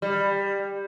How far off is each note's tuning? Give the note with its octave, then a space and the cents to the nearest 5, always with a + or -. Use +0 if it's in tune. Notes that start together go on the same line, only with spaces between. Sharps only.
G3 +15